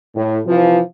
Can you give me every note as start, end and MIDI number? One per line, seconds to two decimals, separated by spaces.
0.15 0.38 45
0.45 0.79 48
0.45 0.79 52
0.45 0.79 53